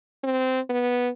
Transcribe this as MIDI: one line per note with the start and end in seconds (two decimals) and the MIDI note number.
0.24 0.60 60
0.69 1.09 59